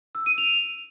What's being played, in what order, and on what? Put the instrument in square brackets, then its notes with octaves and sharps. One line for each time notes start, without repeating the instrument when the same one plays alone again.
[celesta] E6
D#7
F7